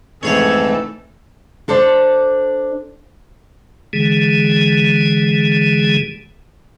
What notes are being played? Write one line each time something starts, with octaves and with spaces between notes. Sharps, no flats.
F2 G#2 E3 A3 C#4 G#4 A4 C#5
D4 A4 C5 D5
D3 E3 G#3 G#4